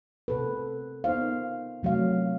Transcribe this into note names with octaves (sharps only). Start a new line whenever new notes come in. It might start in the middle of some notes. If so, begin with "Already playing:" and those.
C3 A4 B4
B3 D#4 C5 F5
C3 F#3 A3 F5